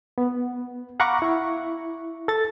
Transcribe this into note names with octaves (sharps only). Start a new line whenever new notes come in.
B3
F5 F#5 A#5 B5 C#6 D6
E4 C#6
A4 A6